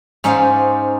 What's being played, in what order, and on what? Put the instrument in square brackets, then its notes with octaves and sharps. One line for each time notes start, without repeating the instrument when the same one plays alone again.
[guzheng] G#2 C#4 D#4 C5 D5 F5